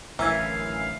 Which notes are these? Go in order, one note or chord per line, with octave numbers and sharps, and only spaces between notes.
A1 F#2 D3 E3 A#4 E5 F5 G#5